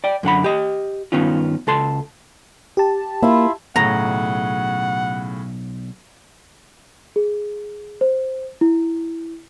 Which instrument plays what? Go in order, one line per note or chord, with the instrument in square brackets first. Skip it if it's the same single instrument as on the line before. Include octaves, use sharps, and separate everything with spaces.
[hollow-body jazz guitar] D5 G5
F#2 D3 F#5 B5
G4 D#5
G2 D#3 B3 C#4 F4
C#2 A4 C6
[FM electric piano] G4 A5
[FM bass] A#3 [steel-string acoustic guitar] E4 F4
[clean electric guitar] B1 [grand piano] A2 C#3 [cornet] F#5 [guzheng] A#5
[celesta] G#4
C5
E4